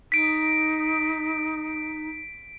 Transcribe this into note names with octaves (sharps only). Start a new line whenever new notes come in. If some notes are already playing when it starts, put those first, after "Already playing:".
D#4 B6 D7